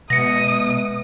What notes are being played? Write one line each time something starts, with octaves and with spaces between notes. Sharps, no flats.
B2 G#3 B4 E5 D#6 A#6 C#7